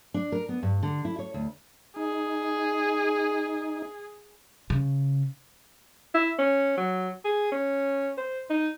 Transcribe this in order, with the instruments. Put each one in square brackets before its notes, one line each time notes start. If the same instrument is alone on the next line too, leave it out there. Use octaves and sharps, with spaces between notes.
[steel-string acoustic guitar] D4
A#4
B3
G2
D3
E4
C#5
D2
[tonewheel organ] D#4 [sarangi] G#4
[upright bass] C#3
[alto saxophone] E4
C#4
F#3
G#4
C#4
C5
D#4